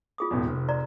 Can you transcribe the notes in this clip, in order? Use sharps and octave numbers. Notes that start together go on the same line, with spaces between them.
F4 G#4 D#6
D#1 G#1 E2
F1
D5 A#5 C6